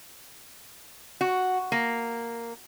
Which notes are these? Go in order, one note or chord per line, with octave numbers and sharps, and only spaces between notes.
F#4
A#3